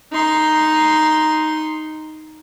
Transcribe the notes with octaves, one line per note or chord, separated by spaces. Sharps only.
D#4 C6